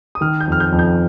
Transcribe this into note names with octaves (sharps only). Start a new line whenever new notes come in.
D#6
D#3 F6
G6
F2 F6
G6
F2
G6